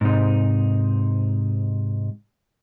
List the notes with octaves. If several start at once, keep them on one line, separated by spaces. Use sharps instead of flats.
G#2 C3 D#4